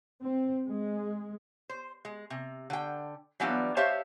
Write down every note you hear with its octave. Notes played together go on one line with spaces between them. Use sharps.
C4
G#3
C5
G#3
C3
D3 G5
E3 F#3 G3 B3 D4 F4
G4 C5 C#5 E5 F5 A5